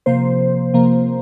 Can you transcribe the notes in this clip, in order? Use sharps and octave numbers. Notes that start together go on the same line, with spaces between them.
C3 F3 A#3 C5
C3 F3 A#3